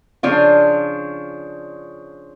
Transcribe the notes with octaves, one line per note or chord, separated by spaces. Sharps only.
C#3 F3 D4 F4